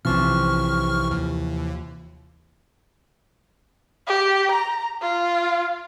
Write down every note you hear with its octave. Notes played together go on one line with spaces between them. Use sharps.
B1 C3 E3 F3 C#6 F6
D#2
G4
A#5
F4